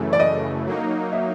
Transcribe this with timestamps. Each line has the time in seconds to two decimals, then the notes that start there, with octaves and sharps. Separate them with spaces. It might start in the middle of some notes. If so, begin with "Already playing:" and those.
Already playing: F#2 C#3 E3 A3
0.13 D5
0.20 D#5
0.66 F#3 A#3 D#4
1.13 E5